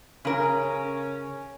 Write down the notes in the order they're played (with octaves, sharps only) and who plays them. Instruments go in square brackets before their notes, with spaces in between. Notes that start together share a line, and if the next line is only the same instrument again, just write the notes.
[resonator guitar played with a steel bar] C#3 A#4 [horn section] C#4